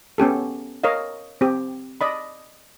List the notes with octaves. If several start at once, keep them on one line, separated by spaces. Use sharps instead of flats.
B3 C#4 G4 A4
A#4 C#5 D#5 F5
C4 G4
D5 D#5 B5